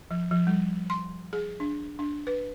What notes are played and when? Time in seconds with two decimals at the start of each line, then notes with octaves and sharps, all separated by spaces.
0.11 F3
0.31 F3
0.47 G3
0.90 C6
1.33 G#4
1.60 D4
1.99 D4
2.27 B4